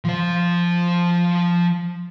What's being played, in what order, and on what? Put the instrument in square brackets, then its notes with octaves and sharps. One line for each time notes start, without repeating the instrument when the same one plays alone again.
[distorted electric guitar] F3 C5